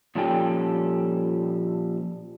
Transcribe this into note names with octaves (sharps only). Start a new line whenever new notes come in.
A#2 F3 G3 C#4 A4 G5